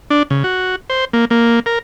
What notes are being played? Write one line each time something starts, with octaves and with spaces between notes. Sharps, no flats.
D4
C#3
F#4
C5
A#3
A#3
A#4